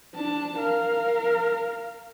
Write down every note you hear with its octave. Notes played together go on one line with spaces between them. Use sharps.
D4 A5
A#4 F5